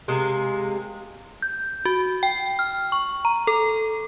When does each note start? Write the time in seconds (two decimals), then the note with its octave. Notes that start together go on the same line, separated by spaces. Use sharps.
0.08 C3 G#3 A#3
1.42 G6
1.85 F#4
2.23 G5
2.59 F6
2.92 C#6
3.25 A#5
3.47 A4